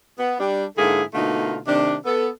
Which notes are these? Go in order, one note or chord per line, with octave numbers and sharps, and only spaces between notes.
B3
G3 D4
G#2 D3 A#3 E4 G#4 A4
B2 D3 A3 A#3 D#4 F4
C3 D#3 A3 D4
B3 A4